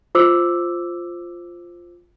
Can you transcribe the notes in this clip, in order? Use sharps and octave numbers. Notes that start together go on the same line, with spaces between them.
F4 C5 D6 E6